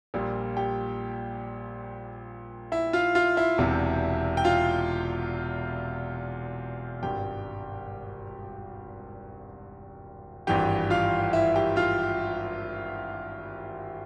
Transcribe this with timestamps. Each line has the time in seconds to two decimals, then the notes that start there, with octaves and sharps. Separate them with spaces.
0.14 A#1 A#2 G3
0.57 G4 G5
2.72 E4 E5
2.93 F4 F5
3.15 F4 F5
3.37 E4 E5
3.58 E1 E2 C3
4.37 G5
4.44 F4 F5
7.03 G#1 G2 G3 G4 G5
10.47 G#1 G2 E3 G4 G5
10.90 F4 F5
11.33 E4 E5
11.56 G4 G5
11.76 F4 F5